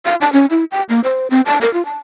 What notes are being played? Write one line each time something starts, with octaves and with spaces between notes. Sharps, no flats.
F5
A5
C#4
E4
G5
A#3
C5
C4
A5
A#4
F4
A5